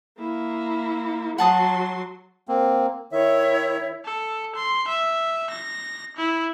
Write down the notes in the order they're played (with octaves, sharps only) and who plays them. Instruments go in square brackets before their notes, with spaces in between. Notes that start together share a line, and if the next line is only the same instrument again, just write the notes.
[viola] A#3 E4
[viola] F#3 C6 [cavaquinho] F#5 A5 D#6
[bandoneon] A#3 C4
[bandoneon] D#3 E5 [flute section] E4 C#5
[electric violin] A4
C6
E5
A#6
E4